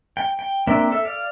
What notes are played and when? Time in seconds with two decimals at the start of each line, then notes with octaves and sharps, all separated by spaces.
0.17 G5
0.39 G5
0.67 A#3 C4 D4 E5 G5
0.90 A4 E5
1.05 D5 F5